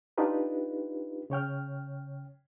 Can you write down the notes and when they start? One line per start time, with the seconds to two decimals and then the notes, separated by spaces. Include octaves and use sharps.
0.18 D4 D#4 F4 G4 B4
1.30 C#3 C#5 G5 F6